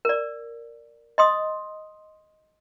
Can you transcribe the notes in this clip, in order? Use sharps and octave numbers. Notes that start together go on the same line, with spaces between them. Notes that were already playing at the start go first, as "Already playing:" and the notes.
A#4 D5
D#5 C6 D#6